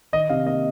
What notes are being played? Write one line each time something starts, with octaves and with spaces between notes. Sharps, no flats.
D#3 D#5
C3 F5
A#3 D#5